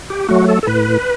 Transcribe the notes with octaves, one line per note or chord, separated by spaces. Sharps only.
G4
F#3 A3 F#4
A4
A4
A2 B4